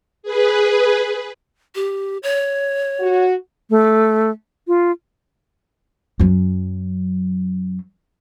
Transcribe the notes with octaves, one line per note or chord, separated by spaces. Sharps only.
G#4 B4
G4
C#5
F#4
A3
F4
F#2 F#3